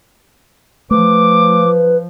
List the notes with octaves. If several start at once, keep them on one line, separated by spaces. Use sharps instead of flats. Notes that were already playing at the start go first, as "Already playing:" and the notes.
F3 A3 B4 D6